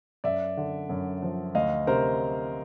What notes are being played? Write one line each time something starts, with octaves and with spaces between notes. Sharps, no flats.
F#2 D5 E5
D3
F#2
F3
D2 D#5 F5
C3 A#4 C5